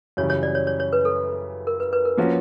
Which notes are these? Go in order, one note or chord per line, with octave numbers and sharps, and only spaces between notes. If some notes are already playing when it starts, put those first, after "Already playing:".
F#2 C#3 E3 G3 C#5
C#5
D5
C#5
C#5
C#5
B4
A4
A#4
B4
B4
A#4
F3 A#3 C#4 F#4